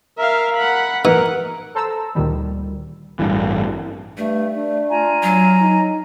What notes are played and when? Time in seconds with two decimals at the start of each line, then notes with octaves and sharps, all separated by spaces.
0.18 A#4 E5 F5
0.56 F#5 B5
1.05 E3 D#4 A#4 F#5
1.75 A4 C5 A5 A#5 E6
2.15 D2 A#2 D#3 G3
3.19 A1 G2 E3
4.18 G2 A3
4.56 D4
4.90 F4 G#5 A#5
5.23 F#3
5.62 D#4